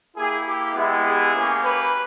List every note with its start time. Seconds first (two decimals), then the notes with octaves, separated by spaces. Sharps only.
0.16 A#3 E4 G4 G#4
0.46 G4
0.75 G#3 B3 E4 G4
1.04 G#4
1.33 A#3 C#4 G4
1.63 B4